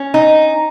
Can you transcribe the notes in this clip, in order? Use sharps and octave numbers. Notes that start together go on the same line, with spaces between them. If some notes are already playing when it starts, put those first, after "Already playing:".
Already playing: C#4
D#4